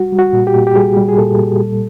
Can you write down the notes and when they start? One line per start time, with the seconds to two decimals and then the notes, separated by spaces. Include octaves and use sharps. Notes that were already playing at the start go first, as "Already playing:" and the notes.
Already playing: G3 F#4
0.12 G3
0.19 F#4
0.33 A#2
0.47 G4
0.54 A#2
0.67 G4
0.76 G3 G#4
0.97 G3
1.09 G#4
1.18 A#2 A4
1.39 A#2
1.60 G3